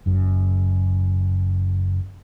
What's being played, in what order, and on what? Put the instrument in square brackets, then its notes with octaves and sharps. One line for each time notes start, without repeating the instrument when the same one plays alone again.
[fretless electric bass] F#1 F#2